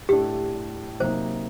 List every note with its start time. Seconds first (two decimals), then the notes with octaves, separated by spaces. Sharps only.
0.09 A2 A3 D4 G4
1.00 C3 F#3 A#3 D#4 C5